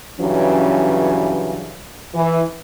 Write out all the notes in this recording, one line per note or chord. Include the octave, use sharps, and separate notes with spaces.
G2 C#3 E3 F#3 C#4
E3